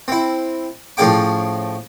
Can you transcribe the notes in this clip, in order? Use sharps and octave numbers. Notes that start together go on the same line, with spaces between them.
C4 E4
A2 F3 C#4 G#4 G5 D6